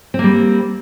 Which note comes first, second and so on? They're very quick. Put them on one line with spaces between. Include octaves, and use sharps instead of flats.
C4 A#3 G3